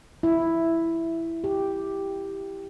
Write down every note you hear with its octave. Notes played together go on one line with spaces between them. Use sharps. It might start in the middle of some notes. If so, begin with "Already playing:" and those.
E4
G4